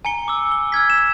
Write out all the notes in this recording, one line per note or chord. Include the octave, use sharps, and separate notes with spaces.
G#5 A#5 C#7 G7
D6 E6
G7
E6 F6 G#6 B6
E7